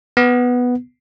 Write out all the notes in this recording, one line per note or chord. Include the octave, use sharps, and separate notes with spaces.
B3